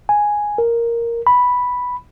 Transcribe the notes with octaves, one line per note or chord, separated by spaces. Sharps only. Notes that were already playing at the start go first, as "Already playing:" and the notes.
G#5
A#4
B5